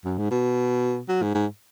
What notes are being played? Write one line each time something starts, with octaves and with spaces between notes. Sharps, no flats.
F#2
G#2
B2
F#3
G#2
G#2